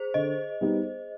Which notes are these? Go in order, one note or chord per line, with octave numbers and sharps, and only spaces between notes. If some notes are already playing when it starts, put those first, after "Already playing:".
Already playing: G#4 C5
D3 D#5
G3 B3 D#4 G4